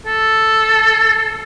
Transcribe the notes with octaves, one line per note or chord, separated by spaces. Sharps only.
A4